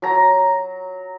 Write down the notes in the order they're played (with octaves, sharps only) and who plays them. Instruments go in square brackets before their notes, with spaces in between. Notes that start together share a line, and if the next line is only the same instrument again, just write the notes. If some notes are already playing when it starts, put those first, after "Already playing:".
[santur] F#3 A#5